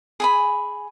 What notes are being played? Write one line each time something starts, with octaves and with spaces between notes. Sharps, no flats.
G#4 G#5 B5